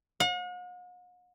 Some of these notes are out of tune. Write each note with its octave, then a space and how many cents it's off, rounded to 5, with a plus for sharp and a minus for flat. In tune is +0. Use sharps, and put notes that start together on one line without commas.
F#5 -45